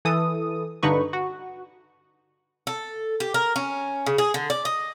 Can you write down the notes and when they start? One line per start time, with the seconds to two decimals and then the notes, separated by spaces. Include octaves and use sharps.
0.05 E3 A4 D#6
0.83 G2 D3 D#4 B4 C#6
1.13 F#4
2.67 A4
3.20 G4
3.34 A#4
3.56 C#4
4.06 C#3
4.18 G#4
4.34 D3
4.50 D5
4.65 D#5